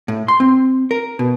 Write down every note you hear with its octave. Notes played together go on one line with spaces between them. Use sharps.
A2
C6
C4
A#4
B2